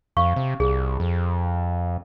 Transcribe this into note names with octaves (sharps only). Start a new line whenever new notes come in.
F2 F5 C#6
C3
C2 G#4
F2